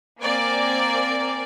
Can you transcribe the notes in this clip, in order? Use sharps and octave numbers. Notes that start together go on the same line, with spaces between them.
A#3 C4 A#4 D5 G#5 D6